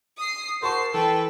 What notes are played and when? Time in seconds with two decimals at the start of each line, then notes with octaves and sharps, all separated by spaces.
0.17 D#6 C7
0.63 F#4 A#4 C5 A5 C#6 C7
0.94 E3 A4 B4 G5